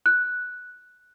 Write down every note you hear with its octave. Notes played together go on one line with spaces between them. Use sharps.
F#6